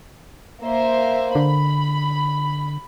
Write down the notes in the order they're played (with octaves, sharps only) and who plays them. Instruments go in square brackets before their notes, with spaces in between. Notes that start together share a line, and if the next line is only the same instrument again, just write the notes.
[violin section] A#3 C5 E5
[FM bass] D3 [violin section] B5